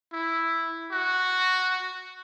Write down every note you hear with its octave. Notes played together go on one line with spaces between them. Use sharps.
E4
F#4